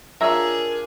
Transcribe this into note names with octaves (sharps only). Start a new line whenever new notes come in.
D4 F4 G#4 A#4 C#5 E5 G#5 A#5